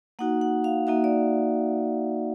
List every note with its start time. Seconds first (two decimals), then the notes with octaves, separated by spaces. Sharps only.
0.19 A#3 D#4 F#4 F#5
0.41 F#5
0.64 F5
0.87 A#3 D#4 F#4 E5
1.04 D5